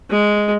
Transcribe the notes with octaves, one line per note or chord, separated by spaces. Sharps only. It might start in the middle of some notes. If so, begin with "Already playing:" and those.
G#3